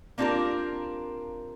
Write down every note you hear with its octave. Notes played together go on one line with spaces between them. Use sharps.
A#3 C4 D4 F4 G4 A#4